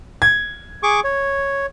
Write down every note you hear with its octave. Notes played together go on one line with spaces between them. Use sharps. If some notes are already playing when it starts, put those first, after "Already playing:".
G#6
G#4 C#6 D6
C#5